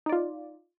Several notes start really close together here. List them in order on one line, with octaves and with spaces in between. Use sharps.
D#4 D5 F4